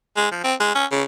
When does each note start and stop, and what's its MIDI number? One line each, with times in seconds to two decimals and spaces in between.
0.17 0.28 56
0.31 0.40 53
0.44 0.54 60
0.60 0.72 56
0.75 0.85 61
0.91 1.04 49